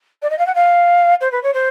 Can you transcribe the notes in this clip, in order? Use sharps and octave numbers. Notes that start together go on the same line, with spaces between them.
D5
D#5
F5
F#5
F5
C5
B4
C#5
C5